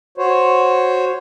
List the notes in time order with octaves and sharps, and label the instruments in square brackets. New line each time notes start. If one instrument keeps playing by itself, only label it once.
[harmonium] F#4 C5 C#5